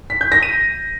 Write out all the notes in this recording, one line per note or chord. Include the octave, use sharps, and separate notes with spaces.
B6
G6
A#6
D#7